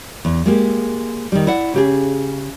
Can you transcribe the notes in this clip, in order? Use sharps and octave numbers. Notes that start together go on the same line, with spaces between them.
E2
G#3 A#3 G4
D#3 G3
E4 D5 F#5
C#3 G4 G#4